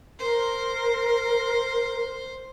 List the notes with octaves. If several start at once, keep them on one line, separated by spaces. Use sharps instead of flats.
A#4 C5